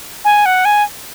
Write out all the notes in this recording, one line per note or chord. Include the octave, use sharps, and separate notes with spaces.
G#5
F#5
G#5